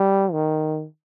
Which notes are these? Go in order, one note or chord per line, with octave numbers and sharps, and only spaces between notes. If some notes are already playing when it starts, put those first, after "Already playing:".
Already playing: G3
D#3